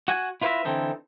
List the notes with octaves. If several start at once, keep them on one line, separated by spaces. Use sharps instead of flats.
F#4 F#5 G#5
E4 F4 B4 C5 D#5 E5
D3 E3 C4 D#4 A4